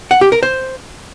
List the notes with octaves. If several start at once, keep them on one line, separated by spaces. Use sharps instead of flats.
F#5
G4
A#4
C5